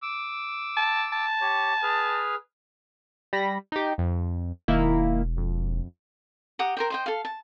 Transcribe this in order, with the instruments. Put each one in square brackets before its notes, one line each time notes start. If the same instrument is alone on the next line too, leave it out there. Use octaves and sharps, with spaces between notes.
[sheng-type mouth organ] D6 E6
[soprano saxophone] A5
A5
[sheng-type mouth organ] G4 C#5
G#4 B4 F6
[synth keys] G3 B5 A#6
D#4 G4
F2
[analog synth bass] E1 [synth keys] D#3 A#3 E4
[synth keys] F2
[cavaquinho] G4 F#5 A#5 D#6
A#4 C5 G5
C5 D#5 G5
A4 F5
A5